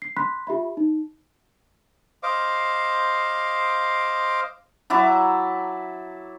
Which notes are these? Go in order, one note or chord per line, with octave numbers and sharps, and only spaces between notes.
C7
B5 C6 F#6 B6
F4 G4 E5 B5
D#4
C5 D#5 F5 D6
F#3 E4 A5 D6